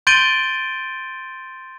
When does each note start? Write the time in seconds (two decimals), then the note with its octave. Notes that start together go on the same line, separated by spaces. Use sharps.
0.07 C6 G6 A6 D7 D#7 G7